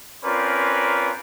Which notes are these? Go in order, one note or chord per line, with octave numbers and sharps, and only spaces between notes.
C4 C#4 F4 A#4 B4 D5